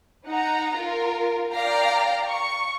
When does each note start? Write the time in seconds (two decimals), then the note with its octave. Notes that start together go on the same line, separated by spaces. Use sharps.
0.28 D#4 F#5 A#5
0.75 F4 A#4
1.52 D5 F5 G5 A#5
2.28 C#6